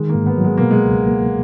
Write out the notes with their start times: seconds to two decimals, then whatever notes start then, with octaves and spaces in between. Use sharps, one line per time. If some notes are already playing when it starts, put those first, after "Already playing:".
Already playing: D#3 G#3
0.09 A#3
0.15 G#2
0.26 B3
0.38 F#3
0.44 G#3
0.57 B2 A#3
0.71 G#3
0.84 C#2
1.07 A#3